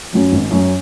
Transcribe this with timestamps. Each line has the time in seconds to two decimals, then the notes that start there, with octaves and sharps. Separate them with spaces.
0.13 F#2 F#3 C#4
0.32 G#1
0.51 F#2 F#3 C#4